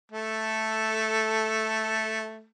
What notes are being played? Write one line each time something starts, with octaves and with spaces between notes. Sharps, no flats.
A3 A4